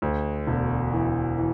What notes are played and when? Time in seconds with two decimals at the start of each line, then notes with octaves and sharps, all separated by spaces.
0.02 D2
0.47 E1
0.93 E3
1.38 E3